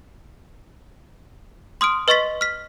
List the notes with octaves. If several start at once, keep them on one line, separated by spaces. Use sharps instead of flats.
C6 D#6 F6 D7
B4 D#5 C6 C#6 A6 B6
F6 B6